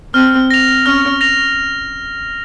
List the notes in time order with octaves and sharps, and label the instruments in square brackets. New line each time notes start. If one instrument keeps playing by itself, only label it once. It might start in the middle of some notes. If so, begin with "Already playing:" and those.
[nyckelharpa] C4 [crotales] F6
[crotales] A#6 F7
[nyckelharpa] C#4 [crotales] F6
[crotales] A#6 F7